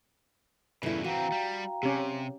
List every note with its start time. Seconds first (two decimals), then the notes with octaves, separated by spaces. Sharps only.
0.83 E2 G2 C#3 E4 A4
1.04 E3 C4 F#4 F5 G5 A#5
1.32 G3
1.83 C3 C#4 G4